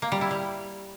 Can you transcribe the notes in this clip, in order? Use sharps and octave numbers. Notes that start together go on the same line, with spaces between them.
A#3
G3
E4
G3